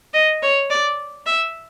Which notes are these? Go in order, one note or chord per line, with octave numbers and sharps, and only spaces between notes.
D#5
C#5
D5
E5